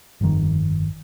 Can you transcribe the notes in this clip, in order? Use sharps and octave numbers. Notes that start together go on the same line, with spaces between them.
G1 F2 D#3